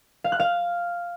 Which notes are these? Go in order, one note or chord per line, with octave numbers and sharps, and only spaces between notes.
F5
F#6
F5